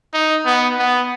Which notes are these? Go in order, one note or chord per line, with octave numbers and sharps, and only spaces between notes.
D#4
B3
B3